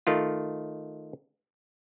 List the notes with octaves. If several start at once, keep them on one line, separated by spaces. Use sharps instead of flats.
D#3 A3 F4